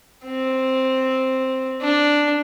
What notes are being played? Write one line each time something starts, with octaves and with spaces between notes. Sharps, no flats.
C4
D4